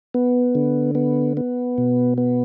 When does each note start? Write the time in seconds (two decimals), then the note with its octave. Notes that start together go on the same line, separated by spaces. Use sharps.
0.14 B3
0.55 D3
0.95 B3
1.37 B3
1.78 B2
2.18 B3